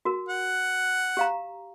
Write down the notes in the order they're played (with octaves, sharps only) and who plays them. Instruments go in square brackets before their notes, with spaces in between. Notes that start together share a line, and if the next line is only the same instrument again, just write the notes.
[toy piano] F#4 A#4
[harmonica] F#5
[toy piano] G4 F5 A#5